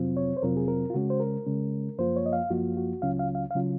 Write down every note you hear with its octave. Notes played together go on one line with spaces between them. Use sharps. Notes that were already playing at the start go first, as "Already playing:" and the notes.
Already playing: F2 C3 F#3 C4 F4
C#5
C5
F2 C3 F#3 C4 F4 A#4
G#4
A#4
F4
C#3 G#3 C#4 F#4
C5
A#4
C#3 G#3 C#4
F#2 F3 A#3 F4 C5
C#5
D#5
F5
F#2 F3 A#3 F4 F#4
F#4
C#2 C#3 F#3 C#4 F4 F5
F5
F5
F5
C#3 F#3 C#4 F4